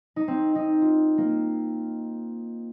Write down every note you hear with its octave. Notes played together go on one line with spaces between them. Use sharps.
D#4
C4
D#4
F4
A#3